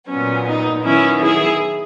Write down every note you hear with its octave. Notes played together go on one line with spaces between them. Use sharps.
A#2 F#3 B3 C#4
D#4
D#3 F#3 B3 C#4 E4
E4 G#4